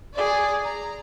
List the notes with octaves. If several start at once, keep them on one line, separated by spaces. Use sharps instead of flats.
G#4 D5
A#5